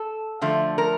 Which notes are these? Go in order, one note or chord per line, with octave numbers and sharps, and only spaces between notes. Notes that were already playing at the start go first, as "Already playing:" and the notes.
Already playing: A4
D3 F3 A3
A#4